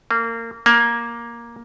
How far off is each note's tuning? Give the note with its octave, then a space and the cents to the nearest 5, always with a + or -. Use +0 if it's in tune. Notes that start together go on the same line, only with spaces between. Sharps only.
A#3 -25
A#3 +10